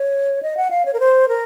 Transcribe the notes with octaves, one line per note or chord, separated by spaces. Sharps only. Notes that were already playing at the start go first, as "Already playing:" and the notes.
Already playing: C#5
D#5
F#5
F5
C#5
A#4
C5
A#4